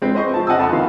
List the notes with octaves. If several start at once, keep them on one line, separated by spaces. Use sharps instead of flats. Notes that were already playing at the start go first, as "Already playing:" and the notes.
G#3 C4 B4
C5 D#5 C#6
F3 A5
D#5 F#5 G#5 A5 D#6 E6
F2 A5 B5 C6
D#3 B3 F5